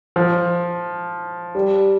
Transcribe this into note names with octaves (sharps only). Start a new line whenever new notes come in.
F3
G3